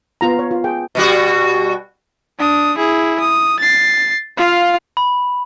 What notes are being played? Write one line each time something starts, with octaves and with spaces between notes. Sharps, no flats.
B3 F4 A#5
C#5
F4
G#4 G5
B2 G3 F#4
D4 D#6
E4 G#4
D#6
A6 C7
F4 F5
B5